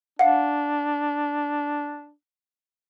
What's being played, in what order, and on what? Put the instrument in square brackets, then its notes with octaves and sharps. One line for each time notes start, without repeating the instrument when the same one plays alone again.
[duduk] D4 [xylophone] F5 F#5